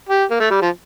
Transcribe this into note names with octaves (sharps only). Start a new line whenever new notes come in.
G4
A#3
A3
G3
F3